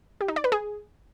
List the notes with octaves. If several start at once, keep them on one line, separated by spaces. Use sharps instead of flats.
G4
D#4
D5
B4
G#4